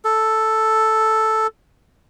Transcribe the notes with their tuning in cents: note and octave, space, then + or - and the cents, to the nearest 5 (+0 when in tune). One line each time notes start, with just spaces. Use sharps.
A4 +0